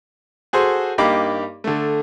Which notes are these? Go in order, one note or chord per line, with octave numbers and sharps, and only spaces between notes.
F#4 G#4 A4 C5
G2 A#3 D#4 G4 B5 D6
D3 A3